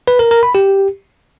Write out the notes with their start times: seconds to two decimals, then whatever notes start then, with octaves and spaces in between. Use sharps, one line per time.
0.08 B4
0.19 A#4
0.31 A#4
0.43 B5
0.55 G4